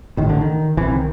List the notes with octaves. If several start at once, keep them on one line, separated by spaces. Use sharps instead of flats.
A1 A2 D#3
D3
D#3
C2 C3 E3
D#3